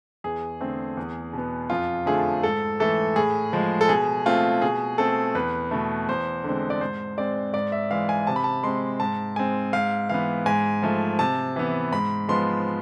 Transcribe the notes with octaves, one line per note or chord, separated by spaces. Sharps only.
E2 G#4
D3 A3 C4
E2
B2 B3
F2 F4
D3 F3 A3 G#4
G#2 A4
E3 A3 A4
A2 G#4
F3 G#3
A4
B2 G#4
A3 C4 F4
B2 G#4
A3 C4 A4
E2 B4
B2 A3
E2 C5
D3 G#3 C4
D5
G#2 C5
G#3 C4 D5
G#2 D5
E5
E3 G#3 F5
G#5
C3 A5
B5
A5
G#3 C4 C6
G#2 A5
G#3 C4 G#5
G#2 F5
E3 B3 F5
G#2 G#5
F3 A3
C3 A5
E3 B3
G#2 B5
F3 G#3 B3 C6